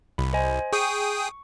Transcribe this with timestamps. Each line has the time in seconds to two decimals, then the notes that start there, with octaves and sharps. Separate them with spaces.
0.18 C2 B5
0.33 C5 D#5 G#5
0.73 G#4 G5 C#6 D#6